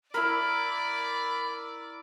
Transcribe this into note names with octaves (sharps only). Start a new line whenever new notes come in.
E4 A#4 D5 B5